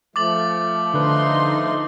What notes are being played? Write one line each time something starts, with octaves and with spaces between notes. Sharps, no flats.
F3 A3 D6 A6 F#7
D3 D4 D#4 B4 C6